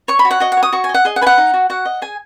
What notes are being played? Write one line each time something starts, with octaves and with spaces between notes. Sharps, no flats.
C#5 C#6
B5
F#4
F#5
F#4 D#5
F#5
C#5
D#6
F#4 C#6
G#5
D#5
F#5
G#4 D#5
F#5
B4 G#5
F#5
D#4
F#4
F#4 F#5
D#5
G#4 G#5